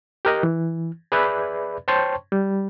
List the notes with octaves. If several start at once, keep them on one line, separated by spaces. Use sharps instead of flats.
G4 A#4 D#5
E3
G#4 B4 D5 E5 B5
C5 C#5 G5 A5 C6 C#6
G3